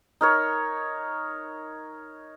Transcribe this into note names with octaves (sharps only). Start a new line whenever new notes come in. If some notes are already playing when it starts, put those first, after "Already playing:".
D#4 A#4 C#5